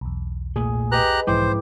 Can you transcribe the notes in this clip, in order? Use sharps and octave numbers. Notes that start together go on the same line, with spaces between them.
B1 E2
A#2 A3 G#4
G4 B4 D#5 A#5 F#6
B1 G#2 E3 F3 E4 C5 G5 D6